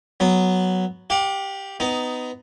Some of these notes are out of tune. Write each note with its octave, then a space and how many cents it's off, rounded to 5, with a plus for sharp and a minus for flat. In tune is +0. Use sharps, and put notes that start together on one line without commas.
F#3 +0 B3 +0
G4 +0 F5 +45
B3 +25 D#4 +0